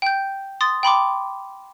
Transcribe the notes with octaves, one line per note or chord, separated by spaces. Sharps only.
G5 G6
C6 D#6 A6
G5 B5 C6 D6